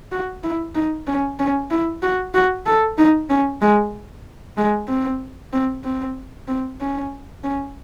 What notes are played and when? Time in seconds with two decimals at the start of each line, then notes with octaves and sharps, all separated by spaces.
0.12 F#4
0.44 E4
0.75 D#4
1.07 C#4
1.39 C#4
1.71 E4
2.02 F#4
2.34 F#4
2.66 A4
2.98 D#4
3.30 C#4
3.62 G#3
4.57 G#3
4.89 C4
5.53 C4
5.85 C4
6.48 C4
6.81 C#4
7.44 C#4